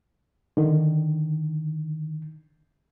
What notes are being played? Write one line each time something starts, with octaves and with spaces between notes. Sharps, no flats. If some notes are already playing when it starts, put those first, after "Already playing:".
D3 D#3